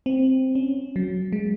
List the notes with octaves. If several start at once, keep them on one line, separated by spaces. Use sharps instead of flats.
C4
C#4
F#3
G#3